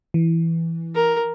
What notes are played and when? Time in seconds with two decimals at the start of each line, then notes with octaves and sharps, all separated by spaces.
0.14 E3
0.95 A#4